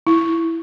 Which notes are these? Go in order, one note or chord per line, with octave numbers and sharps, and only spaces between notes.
E4